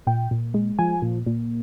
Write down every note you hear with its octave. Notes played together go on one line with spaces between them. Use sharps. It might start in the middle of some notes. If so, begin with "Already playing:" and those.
A#2 G5
A#2
G#3
F3 G#5
A#2
A#2